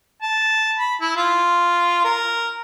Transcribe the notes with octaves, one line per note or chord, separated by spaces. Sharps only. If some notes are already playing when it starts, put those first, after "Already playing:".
A5
B5
E4
F4
A#4